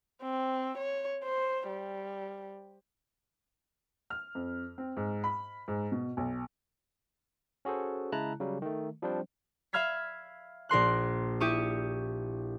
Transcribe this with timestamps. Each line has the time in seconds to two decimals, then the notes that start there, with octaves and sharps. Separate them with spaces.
0.22 C4
0.78 C#5
1.24 C5
1.68 G3
4.10 F6
4.35 F2
4.78 C4
4.97 G#2
5.24 B5
5.68 G#2
5.92 B2
6.17 B1
7.65 C#4 F#4 G#4 A4 C5
8.12 C#3 G#3 E4 A5 A#5 F#6
8.40 C#3 F#3 G3
8.62 D#3 A3
9.02 F3 G3 C4 D4 C5
9.73 E5 F5 B5 F6 G#6 B6
10.69 A#1 A#4 C6 F#6
11.40 E4 G4 C#6 D#6